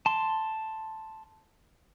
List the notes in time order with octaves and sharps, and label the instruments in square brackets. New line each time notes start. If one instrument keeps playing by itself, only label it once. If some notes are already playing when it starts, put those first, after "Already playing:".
[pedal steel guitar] A5 C6